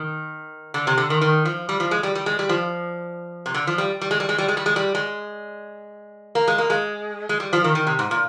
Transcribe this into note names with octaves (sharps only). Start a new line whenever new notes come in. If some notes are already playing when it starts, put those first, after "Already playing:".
Already playing: D#3
D3
C3
D3
D#3
D#3
F3
G3
F3
G#3
G3
G3
G#3
G3
F3
C3
D3
F3
G3
G3
G#3
G3
G#3
G3
G#3
G3
G#3
G3
G#3
A#3
G#3
A#3
G#3
G#3
G3
F3
D#3
D#3
C3
G#2
A#2